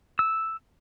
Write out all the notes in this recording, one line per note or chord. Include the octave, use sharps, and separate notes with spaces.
E6